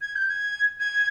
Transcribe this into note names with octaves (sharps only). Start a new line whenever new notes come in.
G#6
G6
G#6
G#6